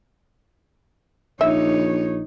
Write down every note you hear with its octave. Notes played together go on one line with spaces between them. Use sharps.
A#1 D#4 C#5 E5